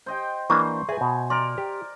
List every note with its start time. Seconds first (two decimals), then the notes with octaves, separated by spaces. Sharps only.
0.06 C5 D#5 G5
0.50 E3 A#3 D4 C5 A#5 C#6
0.89 G#4 B4 E5 G#5
1.01 B2
1.30 A#4 D5 C6
1.58 G4